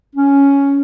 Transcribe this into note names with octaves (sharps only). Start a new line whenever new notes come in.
C#4